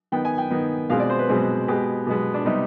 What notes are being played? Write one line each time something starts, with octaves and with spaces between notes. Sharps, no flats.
D#3 B3 G5
G#5
G5
D#3 B3
B2 G#3 C4 F5
D5
C5
B4
B2 G#3 C4
B2 G#3 B3 G4
B2 G#3 B3
D4
C3 G3 B3 D#4